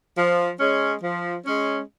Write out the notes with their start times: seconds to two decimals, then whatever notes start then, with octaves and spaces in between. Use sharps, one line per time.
0.16 F3
0.60 G#3 C#4
1.02 F3
1.46 G#3 C#4